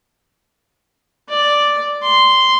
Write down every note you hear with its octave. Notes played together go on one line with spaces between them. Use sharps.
D5
C6